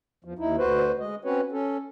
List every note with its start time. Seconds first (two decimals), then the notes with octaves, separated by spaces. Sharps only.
0.24 E2 F3
0.39 D#2 D#4 E4
0.58 D2 F#4 B4 C5
1.00 G#3 D#5
1.25 C4 C#4 F#4 B4 C#5
1.52 C#4 A4